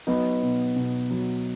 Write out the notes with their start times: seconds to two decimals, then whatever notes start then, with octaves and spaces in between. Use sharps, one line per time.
0.07 F#3 B3 D#4
0.42 B2
0.76 B2
1.10 F#3